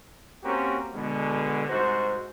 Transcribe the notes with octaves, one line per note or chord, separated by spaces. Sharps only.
A#3 C4 C#4 F#4 G4 A#4
B2 D3 G#3
C2 G#2 F#4 C5